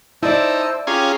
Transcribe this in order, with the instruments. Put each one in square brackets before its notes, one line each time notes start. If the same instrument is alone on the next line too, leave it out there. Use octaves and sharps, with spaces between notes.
[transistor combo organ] D#4 [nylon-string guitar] E4 D5 [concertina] C5 A5 E6
[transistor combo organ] C#4 F4 G#4 [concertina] G4 A#5